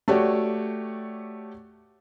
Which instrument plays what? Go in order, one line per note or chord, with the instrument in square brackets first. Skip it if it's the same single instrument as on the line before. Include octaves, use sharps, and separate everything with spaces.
[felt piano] A3 F#4 G4 C#5 D5